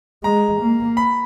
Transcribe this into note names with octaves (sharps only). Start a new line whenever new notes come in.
G#3 A#5
A#3
B5